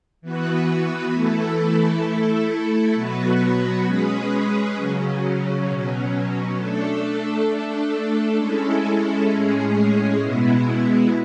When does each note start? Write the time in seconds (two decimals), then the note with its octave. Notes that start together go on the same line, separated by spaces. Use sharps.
0.22 E3 B3 F#4 B4
1.13 E3 A3 E4 A4
2.03 A3 E4 A4
2.94 B2 F#3 B3 F#4 B4
3.85 G#3 C#4 G#4 B4
4.75 C#3 F#3 C#4
5.66 B2 F#3 C#4
6.57 A3 D4 A4
7.48 A3 D4 A4
8.38 G#3 C#4 E4 A4
9.29 A2 G#3 C#4 G#4
10.19 B2 G#3 B3 E4